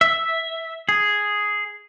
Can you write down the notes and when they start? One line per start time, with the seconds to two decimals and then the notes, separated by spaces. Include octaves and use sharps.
0.01 E5
0.89 G#4